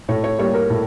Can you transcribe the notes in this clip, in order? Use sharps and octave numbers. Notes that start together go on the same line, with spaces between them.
A2 C#5
C#5
G3 A#3 C#5
A#4
A2